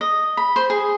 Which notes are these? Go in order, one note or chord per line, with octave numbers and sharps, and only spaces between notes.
D#5
B5
C5
G#4